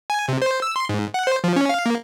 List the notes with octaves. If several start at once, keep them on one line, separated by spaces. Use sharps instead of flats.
G#5
C3
C5
E6
C6
G#2
F#5
C5
F3
C#4
F5
A#3